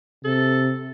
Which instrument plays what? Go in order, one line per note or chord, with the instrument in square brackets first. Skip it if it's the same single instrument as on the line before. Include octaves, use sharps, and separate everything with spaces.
[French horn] C3 [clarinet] A4